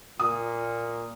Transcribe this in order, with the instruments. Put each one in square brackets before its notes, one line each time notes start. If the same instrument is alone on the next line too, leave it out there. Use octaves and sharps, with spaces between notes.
[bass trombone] A#2 [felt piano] D#6